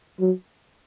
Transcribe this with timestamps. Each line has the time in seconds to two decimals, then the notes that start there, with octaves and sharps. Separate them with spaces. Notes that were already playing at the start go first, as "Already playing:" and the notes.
0.20 F#3